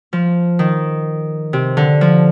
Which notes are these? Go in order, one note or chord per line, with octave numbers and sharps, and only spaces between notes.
F3
D#3
C3
D3
F3